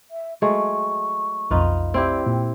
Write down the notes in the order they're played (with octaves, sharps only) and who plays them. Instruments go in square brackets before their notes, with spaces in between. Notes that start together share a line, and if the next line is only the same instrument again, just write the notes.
[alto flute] E5
[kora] F#3 G#3 A3 [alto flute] C#6
[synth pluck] B1 F2 [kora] D#4 F4 B4
[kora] C4 E4 G4 [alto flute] D5
[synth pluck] A#2 [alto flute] G5